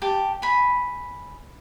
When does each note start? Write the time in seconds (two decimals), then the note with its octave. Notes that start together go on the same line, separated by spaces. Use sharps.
0.02 G4 A5
0.42 G#5 B5